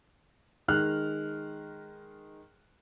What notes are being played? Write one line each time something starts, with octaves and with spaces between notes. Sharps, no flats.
D#3 G#3 F6 F#6